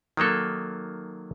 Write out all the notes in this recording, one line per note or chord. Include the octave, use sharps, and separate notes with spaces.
D#3 F#3 A#3 A4